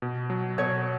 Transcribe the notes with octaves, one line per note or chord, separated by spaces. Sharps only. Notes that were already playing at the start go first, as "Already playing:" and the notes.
B2
F#3
B2 C#5